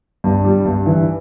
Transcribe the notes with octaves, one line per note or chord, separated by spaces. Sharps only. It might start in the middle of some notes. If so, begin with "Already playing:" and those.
G2
G3
G2
E3